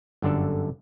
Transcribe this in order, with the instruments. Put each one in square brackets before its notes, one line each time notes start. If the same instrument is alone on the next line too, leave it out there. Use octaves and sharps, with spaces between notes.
[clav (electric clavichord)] G1 F#2 D3 D4 A4